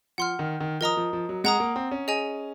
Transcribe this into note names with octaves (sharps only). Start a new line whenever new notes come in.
F3 F#5 C6 F6
D#3
D#3
F3 A#4 D#5 A#5 D#6
F3
F3
F#3
G#3 F#5 A#5 D#6
A#3
C4
C#4
G#4 D#5 G#5